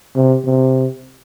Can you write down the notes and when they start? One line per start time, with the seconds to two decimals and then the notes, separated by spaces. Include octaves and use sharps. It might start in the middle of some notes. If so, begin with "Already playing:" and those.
0.16 C3
0.45 C3